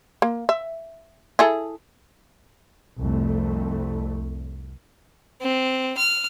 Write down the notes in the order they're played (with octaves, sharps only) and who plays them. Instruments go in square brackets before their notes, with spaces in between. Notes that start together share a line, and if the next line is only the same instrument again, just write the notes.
[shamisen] A#3
E5
E4 G#4 A4
[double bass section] C2 F2 A3
[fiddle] C4
F6